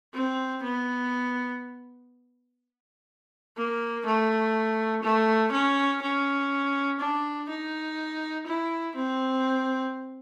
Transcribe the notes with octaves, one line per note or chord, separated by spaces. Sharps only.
C4
B3
A#3
A3
A3
C#4
C#4
D4
D#4
E4
C4